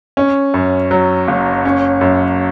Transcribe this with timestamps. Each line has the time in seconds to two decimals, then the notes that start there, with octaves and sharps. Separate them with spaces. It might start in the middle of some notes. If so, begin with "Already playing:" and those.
0.17 C#4
0.54 F#2
0.91 F#3
1.28 F#1
1.65 C#4
2.01 F#2